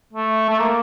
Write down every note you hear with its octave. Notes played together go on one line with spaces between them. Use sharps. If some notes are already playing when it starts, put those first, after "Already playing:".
A3
A3
A#3